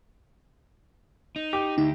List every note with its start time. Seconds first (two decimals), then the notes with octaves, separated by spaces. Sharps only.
1.36 D#4
1.53 G4
1.78 D2 D#4